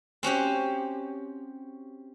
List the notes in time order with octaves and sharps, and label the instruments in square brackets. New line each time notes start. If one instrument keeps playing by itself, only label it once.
[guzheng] C4 C#4 F#4 G4